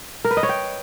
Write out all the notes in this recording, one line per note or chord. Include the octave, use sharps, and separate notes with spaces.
A#4
B4
D#5
C#5
G5